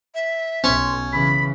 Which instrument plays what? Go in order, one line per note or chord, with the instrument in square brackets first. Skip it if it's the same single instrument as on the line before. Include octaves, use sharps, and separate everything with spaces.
[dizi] E5
[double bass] B1 [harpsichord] C#4 [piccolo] C6
[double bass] C#3 E3 [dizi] B5 [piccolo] B6